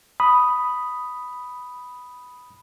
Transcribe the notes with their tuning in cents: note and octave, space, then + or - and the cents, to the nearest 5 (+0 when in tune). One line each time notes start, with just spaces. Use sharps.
B5 +0 D#6 +0